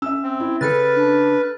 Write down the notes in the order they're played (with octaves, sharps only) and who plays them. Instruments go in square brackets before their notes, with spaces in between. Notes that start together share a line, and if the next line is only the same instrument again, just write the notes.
[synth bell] C#4 [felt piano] E5 E6
[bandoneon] C4
[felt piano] E4
[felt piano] C#3 [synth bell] A4 F6 A6 [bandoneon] B4
[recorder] D4